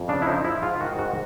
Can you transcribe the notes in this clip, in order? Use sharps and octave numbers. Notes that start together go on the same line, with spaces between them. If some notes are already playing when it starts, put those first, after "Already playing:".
Already playing: F2
C#3 D4
E4
F3 D#4
F3 E4
G#2 F4
D#3 F#4
G#2 F#4